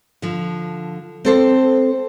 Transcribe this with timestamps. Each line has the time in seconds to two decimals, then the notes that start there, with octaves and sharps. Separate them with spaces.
0.22 D3 F3
1.25 C4 A4 C5